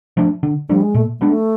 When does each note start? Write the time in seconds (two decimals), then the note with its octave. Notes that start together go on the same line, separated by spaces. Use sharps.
0.17 F3 A3 D4
0.43 D3
0.69 F3 G3 A3 D4
0.81 G#3
0.94 A#2 A3
1.19 F#3 G#3 B3 D4
1.29 A3